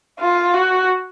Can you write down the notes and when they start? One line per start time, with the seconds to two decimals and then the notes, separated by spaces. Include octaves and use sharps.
0.20 F4
0.54 F#4